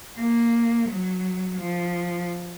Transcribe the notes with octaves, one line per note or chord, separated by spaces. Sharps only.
A#3
F#3
F3